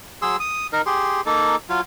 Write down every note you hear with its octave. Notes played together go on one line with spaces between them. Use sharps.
F#3 G#4 C6 E6
D#6
D#4 A#4
G4 G#4 C6
A#3 D#4 A4
F#3 F4